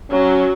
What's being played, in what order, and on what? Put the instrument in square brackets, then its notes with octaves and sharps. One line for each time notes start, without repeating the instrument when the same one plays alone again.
[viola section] F#3 [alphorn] C#4